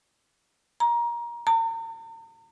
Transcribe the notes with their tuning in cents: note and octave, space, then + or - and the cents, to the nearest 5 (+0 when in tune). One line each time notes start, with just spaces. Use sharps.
A#5 +20
A#5 -40